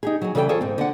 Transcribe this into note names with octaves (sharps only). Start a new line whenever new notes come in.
D#4 G4 G#4
F#3 G#4
C#3 E3 G3 A4 D#5 G5
F4 G#4 A4 C5 C#5
G#2 C4
D3 F#5